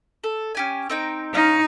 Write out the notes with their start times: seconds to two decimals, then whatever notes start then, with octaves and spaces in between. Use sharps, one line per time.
0.24 A4
0.55 C#4 G4 G#5
0.90 C4 D#4 G5
1.34 C#4 D#4 F5